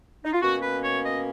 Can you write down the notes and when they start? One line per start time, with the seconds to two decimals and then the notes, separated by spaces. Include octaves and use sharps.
0.25 D#4
0.33 F4
0.42 B2 A#3 C#4 F#4
0.63 B4
0.84 C#5
1.05 D#5